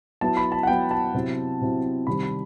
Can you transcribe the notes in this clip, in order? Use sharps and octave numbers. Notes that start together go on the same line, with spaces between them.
F#3 B3 E4 A5
B5
A5
F#5
F#3 B3 E4 G5
A5
C3 F#3 C4 E4
C3 F#3 C4 E4
C3 D#3 G3 C4 B5
B5